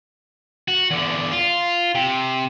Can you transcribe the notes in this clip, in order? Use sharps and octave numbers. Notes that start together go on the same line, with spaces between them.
F#4
E2 D3
F4
C3